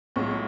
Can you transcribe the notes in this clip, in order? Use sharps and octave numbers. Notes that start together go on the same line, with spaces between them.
B1 A2 G#3 C#4 F4 C#6